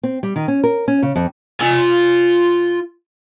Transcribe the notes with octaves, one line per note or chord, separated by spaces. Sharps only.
C4
G3
D#3
C#4
A#4
C#4
C#3
F2
F4 G#5